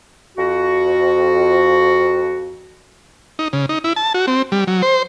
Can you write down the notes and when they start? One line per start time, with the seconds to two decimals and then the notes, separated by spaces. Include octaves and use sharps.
0.37 F2 F#4
3.39 D#4
3.53 C#3
3.69 D#4
3.84 E4
3.96 A5
4.14 F#4
4.27 C4
4.52 G3
4.67 F#3
4.82 C5